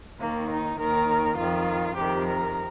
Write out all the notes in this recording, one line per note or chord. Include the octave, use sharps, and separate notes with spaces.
D#2 D#3 A#3
D#4
D#2 D#3 A#4
F2 D#3 F4
F2 C3 D#3 G4
A#4